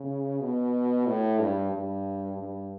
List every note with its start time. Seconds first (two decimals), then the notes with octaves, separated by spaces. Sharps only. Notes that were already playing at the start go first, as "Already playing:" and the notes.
Already playing: C#3
0.41 B2
1.06 A2
1.40 G2
1.72 G2
2.37 G2